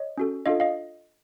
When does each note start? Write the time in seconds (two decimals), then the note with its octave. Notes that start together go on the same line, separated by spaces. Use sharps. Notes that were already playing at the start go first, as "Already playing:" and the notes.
Already playing: C#5 D#5
0.17 C#4 F#4 A4
0.46 D4 F4 A4 D#5 F5
0.60 D#5 F5